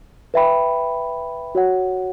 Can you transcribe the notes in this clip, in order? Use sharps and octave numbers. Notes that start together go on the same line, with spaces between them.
B4 E5 G5 B5
F#4 C#5 F#5